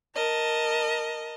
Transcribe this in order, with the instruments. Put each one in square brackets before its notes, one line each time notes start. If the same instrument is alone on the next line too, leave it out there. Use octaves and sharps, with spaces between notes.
[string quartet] A#4 D#5 A5